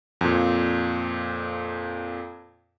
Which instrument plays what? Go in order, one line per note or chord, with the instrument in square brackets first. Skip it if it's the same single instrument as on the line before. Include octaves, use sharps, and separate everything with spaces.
[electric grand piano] F2 A#2